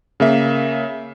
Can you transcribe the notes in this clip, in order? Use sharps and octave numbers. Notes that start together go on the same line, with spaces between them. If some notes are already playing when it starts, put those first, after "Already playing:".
C#3 A#3 E5